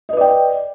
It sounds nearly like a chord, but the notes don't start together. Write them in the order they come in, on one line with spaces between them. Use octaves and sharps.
D#5 B4 D5 G5